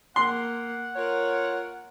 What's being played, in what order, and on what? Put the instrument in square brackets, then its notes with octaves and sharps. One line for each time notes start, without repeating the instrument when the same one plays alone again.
[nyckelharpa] A#3 [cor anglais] F#5 [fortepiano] C6
[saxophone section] F4 C#5 [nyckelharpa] A#4